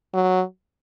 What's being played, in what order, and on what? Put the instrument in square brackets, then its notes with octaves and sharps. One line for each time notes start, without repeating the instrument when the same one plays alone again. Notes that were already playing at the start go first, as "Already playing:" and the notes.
[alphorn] F#3